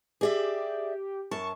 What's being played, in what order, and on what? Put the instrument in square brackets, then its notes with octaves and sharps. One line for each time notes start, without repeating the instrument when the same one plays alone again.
[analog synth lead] G4 [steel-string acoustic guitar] G#4 D5 E5
[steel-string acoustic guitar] F#2 A5 [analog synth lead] C#6